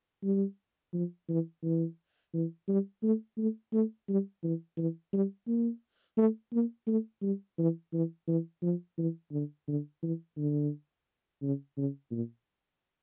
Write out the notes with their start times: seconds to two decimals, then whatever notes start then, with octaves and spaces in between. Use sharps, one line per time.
0.23 G3
0.93 F3
1.29 E3
1.63 E3
2.34 E3
2.68 G3
3.03 A3
3.38 A3
3.73 A3
4.09 G3
4.43 E3
4.77 E3
5.13 G3
5.47 A#3
6.17 A3
6.53 A#3
6.87 A3
7.22 G3
7.58 E3
7.93 E3
8.27 E3
8.63 F3
8.98 E3
9.32 D3
9.68 D3
10.02 E3
10.37 D3
11.42 C#3
11.77 C#3
12.11 A#2